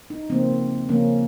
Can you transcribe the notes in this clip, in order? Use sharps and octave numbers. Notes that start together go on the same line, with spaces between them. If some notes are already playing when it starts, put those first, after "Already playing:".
D#4
C#3 F3 A#3 C4
C#3 F3 A#3 C#4